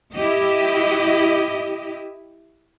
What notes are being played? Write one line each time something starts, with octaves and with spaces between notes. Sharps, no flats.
E4 G4 D#5